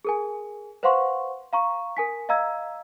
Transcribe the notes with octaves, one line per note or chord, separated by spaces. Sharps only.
G#4 A#4 G#5
B4 C5 F5 F#5 C6 C#6
F5 A#5 C#6
A#4 G#5 B6
D#5 F5 A#5 E6 G#6